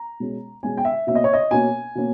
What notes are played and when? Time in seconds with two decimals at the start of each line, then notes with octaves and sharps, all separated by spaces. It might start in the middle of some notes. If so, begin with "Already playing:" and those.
Already playing: A#5
0.20 B2 G#3 C#4
0.63 B2 G#3 C#4 G#5
0.77 G5
0.85 E5
1.07 B2 A#3 C#4 E5
1.15 D#5
1.24 C#5
1.33 D#5
1.51 B2 A#3 C#4 G#5
1.95 B2 A#3 C#4